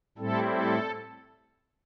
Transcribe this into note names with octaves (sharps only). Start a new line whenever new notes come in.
A2 G3 C4 E4 A4
A4